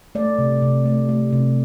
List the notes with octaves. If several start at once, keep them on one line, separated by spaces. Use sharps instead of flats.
A3 D5
C3
C3
A3
A3
C3